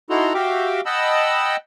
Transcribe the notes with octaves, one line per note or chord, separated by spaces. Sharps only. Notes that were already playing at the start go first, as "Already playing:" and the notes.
D#4 E4 F#4 A4 A#5 C6
F#4 G4 E5 F5 G5 D6
D#5 F#5 G5 A5 B5 E6